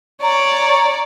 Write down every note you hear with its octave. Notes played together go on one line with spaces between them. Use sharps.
C#5 D5 A#5